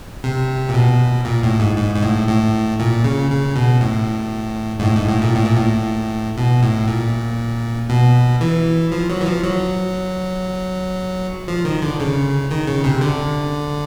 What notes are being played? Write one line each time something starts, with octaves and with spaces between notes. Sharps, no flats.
C3
A#2
B2
A#2
A2
G#2
G#2
G#2
A2
A2
A#2
C#3
C#3
B2
A2
G#2
A2
G#2
A2
A#2
A2
A#2
A2
B2
A2
A#2
B2
E3
F3
F#3
E3
F3
F#3
F3
D#3
D3
C#3
D#3
C#3
C3
D3